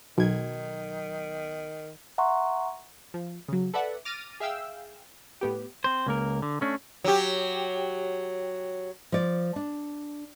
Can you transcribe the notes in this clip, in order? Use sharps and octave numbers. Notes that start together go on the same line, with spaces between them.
B1 D#3 G#6
E5 F#5 A#5 C6 C#6
F3
C#3 F#3
A4 B4 D5 E5 F#5
D6 F6 A6 A#6 D#7
G#4 E5 F5 G5 E6
A2 B3 G4
C4 C5
C#2 A#3 A#4
D3
A3 C#4 D4
F#3 G4
F3 D5
D4